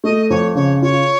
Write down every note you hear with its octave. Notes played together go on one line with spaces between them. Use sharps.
A3 D#5
F2 C#5
C#3 C#5
F4 C#5